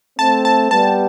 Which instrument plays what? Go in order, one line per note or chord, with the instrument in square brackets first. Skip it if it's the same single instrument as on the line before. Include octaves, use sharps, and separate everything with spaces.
[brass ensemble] A3 C4 [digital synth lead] A5
[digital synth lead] A5
[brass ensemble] G3 B3 [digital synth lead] A5